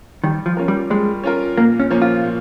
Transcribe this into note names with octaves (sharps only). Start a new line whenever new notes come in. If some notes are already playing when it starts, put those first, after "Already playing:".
D#3 G3
F3
C#4 F4 A#4
G3
G3 G#3
C#4 F4 A#4
A#2 A#3
C#4
F3 A#3 C#4
F4
A#2